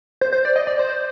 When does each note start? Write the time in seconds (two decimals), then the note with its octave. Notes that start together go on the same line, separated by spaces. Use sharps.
0.21 C5
0.33 C5
0.45 D5
0.56 D#5
0.67 D5
0.79 C5